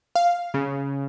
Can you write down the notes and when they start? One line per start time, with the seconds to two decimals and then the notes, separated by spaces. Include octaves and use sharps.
0.15 F5
0.54 C#3